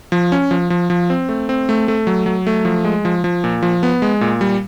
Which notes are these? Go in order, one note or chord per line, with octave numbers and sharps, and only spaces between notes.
F3
C#4
F3
F3
F3
C4
A3
C4
A3
A3
F#3
F#3
A3
F3
G#3
F3
F3
A#2
F3
B3
G#3
A#2
G3